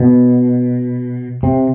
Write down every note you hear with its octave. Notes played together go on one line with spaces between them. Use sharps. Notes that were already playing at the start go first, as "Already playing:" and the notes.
Already playing: B2
C3